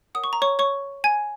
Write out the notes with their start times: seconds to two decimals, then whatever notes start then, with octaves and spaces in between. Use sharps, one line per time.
0.15 A#4 C#5 F#5 D#6
0.24 C#6
0.33 A#5
0.42 C#5 C#6
0.59 C#5 C#6
1.04 G#5 G#6